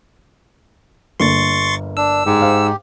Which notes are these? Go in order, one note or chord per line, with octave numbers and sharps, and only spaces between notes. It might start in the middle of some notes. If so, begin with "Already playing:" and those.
G1 D3 A#3 C6 C#6 A6
D4 E6
G#2 G4
C5 F5